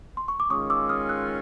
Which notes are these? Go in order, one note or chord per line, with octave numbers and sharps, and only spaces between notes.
C6
C#6
D6
D#3 G#3 C#4 F4 C#6 D#6
D6 E6
D#6 F6
E6 F#6